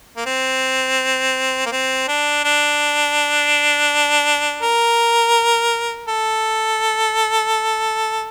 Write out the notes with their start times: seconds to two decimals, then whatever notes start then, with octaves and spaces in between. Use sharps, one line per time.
0.17 A#3
0.26 C4
1.66 A#3
1.72 C4
2.08 D4
2.45 D4
4.62 A#4
6.08 A4